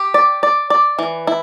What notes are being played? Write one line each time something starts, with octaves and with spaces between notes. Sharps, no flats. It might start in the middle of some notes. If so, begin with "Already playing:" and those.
Already playing: G4
D5
D5
D5
E3
E4